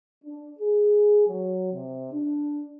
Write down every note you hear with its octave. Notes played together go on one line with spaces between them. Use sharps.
D4
G#4
F#3
C3
D4